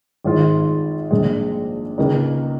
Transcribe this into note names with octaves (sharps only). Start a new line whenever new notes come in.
G#1 G#2 G#3 F4
A#1 A#2 G#3
C#2 C#3 A#3 D#4